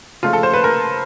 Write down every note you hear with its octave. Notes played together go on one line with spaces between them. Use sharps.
C#3 F3 A3 F4
A4
C5
B4
A#4